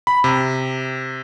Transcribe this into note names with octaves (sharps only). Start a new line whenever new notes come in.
B5
C3